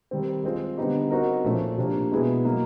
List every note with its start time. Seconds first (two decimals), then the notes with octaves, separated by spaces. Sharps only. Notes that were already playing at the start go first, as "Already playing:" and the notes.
0.11 D#3 G3 C4
0.44 G#3 C4 F4
0.78 D3 G3 B3 D#4 G4
1.11 C4 D#4 F#4 A#4
1.44 A#2 F3 A3 C#4
1.78 C3 F3 A#3 D4
2.11 B2 G#3 B3 E4 G#4
2.45 F#3 A#3 D#4